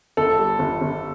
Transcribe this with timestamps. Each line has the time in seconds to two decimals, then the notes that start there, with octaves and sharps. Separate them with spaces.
0.17 G1 A4
0.38 G3
0.59 G1
0.81 G1